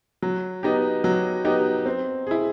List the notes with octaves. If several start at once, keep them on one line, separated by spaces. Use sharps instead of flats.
F#3
B3 D#4 G4
F#3
B3 D#4 G4
C4
E4 G#4